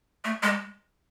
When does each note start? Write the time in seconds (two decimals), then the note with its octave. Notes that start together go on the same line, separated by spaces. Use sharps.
0.24 A3
0.43 G#3